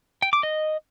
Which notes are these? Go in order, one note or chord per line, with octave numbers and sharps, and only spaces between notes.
G5
D6
D#5